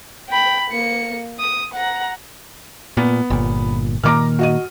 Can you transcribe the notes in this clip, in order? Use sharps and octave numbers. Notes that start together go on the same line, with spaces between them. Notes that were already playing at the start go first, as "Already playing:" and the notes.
G5 B5
A#3 C#7
D#6
F#5 A#5
A#2 B3
G1 A#2
A#2 D#3 A#3 A#5 D6 F6
F#4 D#5 D#7